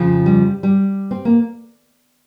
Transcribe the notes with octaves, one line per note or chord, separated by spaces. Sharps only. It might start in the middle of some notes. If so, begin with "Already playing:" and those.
Already playing: F2 C#3 F3
G3
G3
C4
A#3